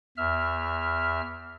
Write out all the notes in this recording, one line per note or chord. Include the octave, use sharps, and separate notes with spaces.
E2 E5 F6